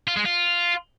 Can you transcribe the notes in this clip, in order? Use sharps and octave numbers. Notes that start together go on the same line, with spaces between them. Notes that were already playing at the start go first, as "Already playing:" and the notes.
F4
G#3
F4